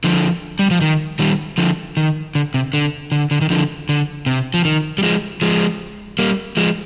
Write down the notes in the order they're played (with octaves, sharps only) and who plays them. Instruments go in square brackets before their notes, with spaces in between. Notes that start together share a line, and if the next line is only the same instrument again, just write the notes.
[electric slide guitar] D3 F3
G3
F3
D#3
D#3 G3
D3 F3
D#3
D3
C3
D3
D3
D3
D#3
D3 F3
D3
C3
F3
D#3
G3
F3 G#3
F3 G#3
G3 A#3
F3 G#3